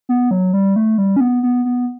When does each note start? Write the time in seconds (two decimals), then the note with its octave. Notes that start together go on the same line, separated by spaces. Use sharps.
0.09 B3
0.31 F#3
0.53 G3
0.76 A3
0.98 G3
1.16 C#4
1.20 B3
1.43 B3
1.65 B3